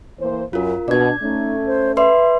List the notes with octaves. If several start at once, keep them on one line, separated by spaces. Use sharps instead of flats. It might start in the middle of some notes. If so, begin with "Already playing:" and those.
E3 A#3 C5
F#2 F4 A#4
B2 D4 D5 G#6
A3 C#4 D#4
C5
B4 D5 E5 C6